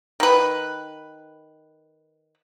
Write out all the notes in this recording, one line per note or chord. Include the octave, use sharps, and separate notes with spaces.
D#3 B4